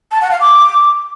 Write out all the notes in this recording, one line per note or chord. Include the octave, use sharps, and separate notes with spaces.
A5
F#5
F5
D6